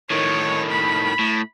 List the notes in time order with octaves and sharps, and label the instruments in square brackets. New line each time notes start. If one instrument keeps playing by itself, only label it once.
[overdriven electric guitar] A2 D#3 [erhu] C#5
[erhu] B5
[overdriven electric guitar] A2